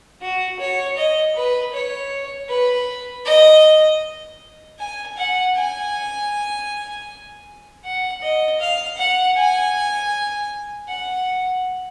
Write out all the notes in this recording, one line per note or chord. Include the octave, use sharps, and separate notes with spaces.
F#4
C#5
D#5
B4
C#5
B4
D#5
G#5
F#5
G#5
F#5
D#5
F5
F#5
G#5
F#5